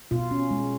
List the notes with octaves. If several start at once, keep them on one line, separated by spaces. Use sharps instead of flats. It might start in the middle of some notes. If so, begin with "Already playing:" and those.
B2 F4
C#4
G#3